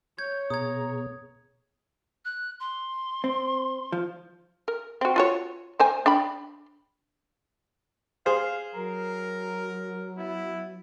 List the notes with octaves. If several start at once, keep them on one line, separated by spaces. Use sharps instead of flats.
C#5 G6 G#6
B2 B3 G#4 A#5 D#6 G#6
F#6
C6
C4
F3
A#4
C4 F#4
F4 F#4 C#5
A#3 C5 G#5
D4 G5 B5
G#4 C5 F5
F#3 A#4
B3 E4